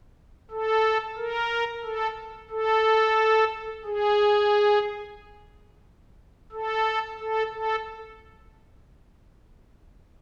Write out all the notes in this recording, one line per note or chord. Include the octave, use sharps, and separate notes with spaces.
A4
A#4
A4
A4
G#4
A4
A4
A4